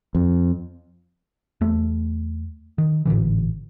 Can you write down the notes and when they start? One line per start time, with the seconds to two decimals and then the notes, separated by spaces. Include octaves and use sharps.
0.15 F2
1.61 E2 A3
2.78 D#3
3.06 G#1 A2 D3 E3